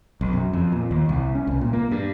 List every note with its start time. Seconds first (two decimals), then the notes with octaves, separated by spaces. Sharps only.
0.21 B1
0.33 F#2
0.53 F2
0.72 A#2
0.91 D#2
1.09 C2
1.35 C#4
1.47 C2
1.61 A#2
1.73 A#3
1.91 G2